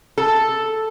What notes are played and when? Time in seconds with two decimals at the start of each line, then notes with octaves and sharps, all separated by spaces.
0.18 A4